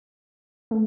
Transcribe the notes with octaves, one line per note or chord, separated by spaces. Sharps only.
A3